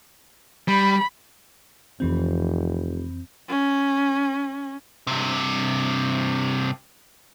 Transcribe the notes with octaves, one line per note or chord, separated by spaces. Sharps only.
G3 B5
F1 F2 E3 C4
C#4
G2 C3